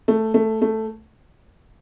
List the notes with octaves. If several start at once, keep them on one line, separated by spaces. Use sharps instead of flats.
A3
A3
A3